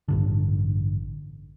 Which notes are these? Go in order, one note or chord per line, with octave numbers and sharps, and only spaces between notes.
A1 G2 D3